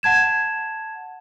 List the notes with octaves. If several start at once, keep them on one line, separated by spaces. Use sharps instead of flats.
F#5 A5 G#6 E7